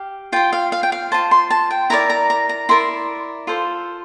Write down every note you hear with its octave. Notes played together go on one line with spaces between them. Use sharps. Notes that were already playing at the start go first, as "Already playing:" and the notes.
Already playing: G4 F5
F4 C5 G5
F5
F5
G5
F5
F4 C5 A5
C6
A5
G5
E4 A#4 D5 A#5
A#5
A#5
A#5
E4 A#4 D5 C6
F4 A4 C5